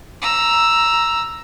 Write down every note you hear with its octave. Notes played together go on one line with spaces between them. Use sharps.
A#5 E6